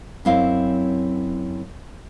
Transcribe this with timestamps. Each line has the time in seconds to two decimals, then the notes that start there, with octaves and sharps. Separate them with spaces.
0.25 F#2 F#3 C4 E4 D#5 F5